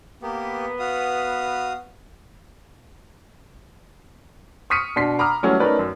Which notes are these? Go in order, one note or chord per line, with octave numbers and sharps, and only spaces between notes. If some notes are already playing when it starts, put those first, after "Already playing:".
A#3 B3 G4
F#4 F5 D#6
C#6 D#6 F6 B6 C#7 D#7
B2 D4 C6 B6 C7
A#5 B5 D6 D#6 F6
E3 F#3 G3 A3 C#4
A3 C#4 D#4 A#4 B4 D5
F#2